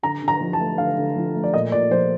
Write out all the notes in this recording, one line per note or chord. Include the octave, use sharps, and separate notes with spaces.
D3 A#5
D3
A#5
F3
A5
A3
D3 F5
D3
F3
A3
D5
A#2 D#5
A#2 D5
F3 C5